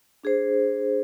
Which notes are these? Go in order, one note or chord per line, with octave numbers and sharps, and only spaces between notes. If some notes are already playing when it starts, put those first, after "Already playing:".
D4 G#4 C5